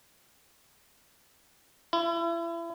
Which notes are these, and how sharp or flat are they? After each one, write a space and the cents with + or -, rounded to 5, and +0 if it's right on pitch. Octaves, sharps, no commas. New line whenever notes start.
E4 +35